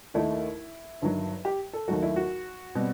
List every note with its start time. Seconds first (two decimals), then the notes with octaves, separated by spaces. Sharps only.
0.14 D#2 D#3 A3 D#4 E4
1.02 G1 G2 D#3 F#3
1.45 G4
1.73 A4
1.88 D#2 D#3 F#3 A3 F#4
2.02 E4
2.16 F#4
2.75 B2 G3 C4